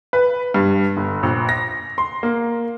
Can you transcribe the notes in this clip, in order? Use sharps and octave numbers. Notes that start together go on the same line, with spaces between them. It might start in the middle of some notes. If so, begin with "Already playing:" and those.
B4
G2
G1
A#1
A#6
C6
A#3